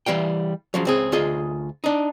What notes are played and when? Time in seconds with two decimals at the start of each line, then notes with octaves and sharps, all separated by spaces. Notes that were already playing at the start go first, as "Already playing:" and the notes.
0.06 E3 G3 F5 G5
0.74 C#3 F3 F#3
0.85 C#2 C4 G#4
1.12 D2 F4 G#4 D#5
1.84 D4 D#4